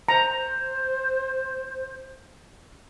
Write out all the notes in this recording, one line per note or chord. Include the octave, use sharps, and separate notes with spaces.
C5 A#5